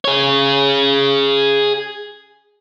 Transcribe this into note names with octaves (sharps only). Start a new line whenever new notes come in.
G#4 C#5